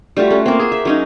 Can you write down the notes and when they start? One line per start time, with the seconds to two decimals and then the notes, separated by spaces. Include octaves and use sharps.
0.17 G3 A3 F4 F#4
0.30 A3 C#4
0.46 A#3 C4
0.59 C4 G#4
0.72 E5
0.85 F#3 C#4 D#4